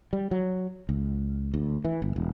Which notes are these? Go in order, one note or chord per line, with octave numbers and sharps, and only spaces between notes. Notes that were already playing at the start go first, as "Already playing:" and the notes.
G3
F#3
C#2
D2
E3
G1
E1